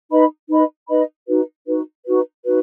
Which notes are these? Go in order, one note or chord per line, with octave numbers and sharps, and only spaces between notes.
D#4 B4 D#5 B5
D#4 B4 D#5 B5
D#4 B4 D#5 B5
D#4 F#4 B4
D#4 F#4 B4
D#4 F#4 B4
D#4 F#4 B4